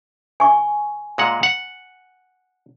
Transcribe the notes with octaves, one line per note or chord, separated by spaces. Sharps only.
G#5 C#6
A#2 G#3 F#5
F#5